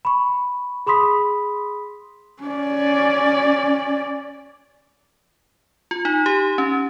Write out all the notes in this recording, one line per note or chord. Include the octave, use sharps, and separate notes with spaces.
B5 C#6
G#4 B5 C6 D#6 B6
C#4 D5
F4
D#4
G4
C#4